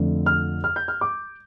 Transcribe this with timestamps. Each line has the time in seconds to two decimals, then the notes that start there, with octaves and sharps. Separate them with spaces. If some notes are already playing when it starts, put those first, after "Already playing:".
Already playing: F2 D3 F3 A3
0.26 F6
0.64 F6
0.76 G6
0.88 F6
1.01 D6